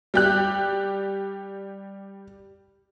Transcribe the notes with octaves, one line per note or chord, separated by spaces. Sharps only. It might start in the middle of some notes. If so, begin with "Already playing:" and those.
G3 G4 F#6